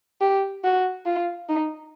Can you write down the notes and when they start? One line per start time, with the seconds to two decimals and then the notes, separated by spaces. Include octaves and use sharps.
0.21 G4
0.64 F#4
1.06 F4
1.49 D#4